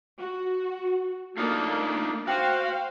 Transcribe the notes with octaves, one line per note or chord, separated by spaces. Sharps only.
F#4
A3 A#3 D4 D#4 F4
F#4 C5 F5 G5